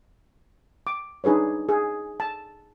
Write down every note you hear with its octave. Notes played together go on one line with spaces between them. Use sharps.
D6
D4 D#4 G#4 B4 C#5
G#4
A5